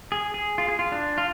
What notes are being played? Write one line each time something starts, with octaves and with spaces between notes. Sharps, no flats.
G#4
G#4
F4
G#4
F4
D4
F4